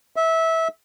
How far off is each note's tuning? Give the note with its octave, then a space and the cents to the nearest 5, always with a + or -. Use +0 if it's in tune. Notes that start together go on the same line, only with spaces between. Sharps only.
E5 -20